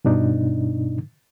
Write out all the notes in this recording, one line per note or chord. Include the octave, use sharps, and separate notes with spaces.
G2 B2 D4 D#4